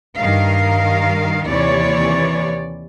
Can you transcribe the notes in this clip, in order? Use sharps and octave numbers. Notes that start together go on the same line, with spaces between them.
G2 D#3 A#4 F5
D#2 C3 E3 C#5 D5